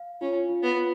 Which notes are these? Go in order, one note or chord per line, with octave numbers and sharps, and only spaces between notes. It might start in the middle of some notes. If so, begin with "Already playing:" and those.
Already playing: F5
C#4 F4
F4
B3
F4